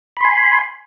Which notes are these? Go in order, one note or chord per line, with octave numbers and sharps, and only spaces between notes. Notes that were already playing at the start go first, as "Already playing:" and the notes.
G#5 B5 C6